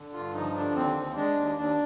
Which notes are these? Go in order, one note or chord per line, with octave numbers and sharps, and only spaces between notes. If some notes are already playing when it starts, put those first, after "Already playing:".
Already playing: D3
G2 F4
F3 D#4
D3 D4
D#2 C4
D#2
G#3 D4
D#2
D#2 D4